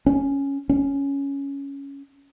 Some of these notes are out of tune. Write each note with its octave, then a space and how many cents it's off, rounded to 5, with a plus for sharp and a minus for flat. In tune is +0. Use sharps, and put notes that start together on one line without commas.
C#4 +0
C#4 +5